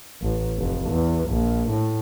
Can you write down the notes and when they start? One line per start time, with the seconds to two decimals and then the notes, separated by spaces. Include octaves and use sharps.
0.22 A1
0.58 F1
0.90 E2
1.29 A#1
1.69 A2